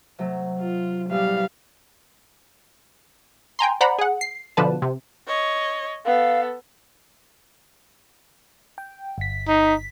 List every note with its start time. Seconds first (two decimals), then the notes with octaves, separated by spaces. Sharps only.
0.19 C3 F#3 A3
0.60 F4
1.09 A1 G3 B3 F5 E6
3.59 G5 G#5 A#5 C6
3.81 C5 D5 F#5 A#5 B5
3.98 G#4 F#5
4.21 C7
4.57 B2 D3 F3 B4 A5
4.82 C3
5.27 C#5 D#5
6.05 B3 A4 F5
8.78 G5
9.18 G1 B6
9.48 D#4